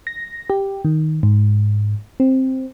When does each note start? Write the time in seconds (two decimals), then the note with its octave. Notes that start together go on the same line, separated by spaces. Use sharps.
0.07 A#6
0.50 G4
0.85 D#3
1.23 G#2
2.20 C4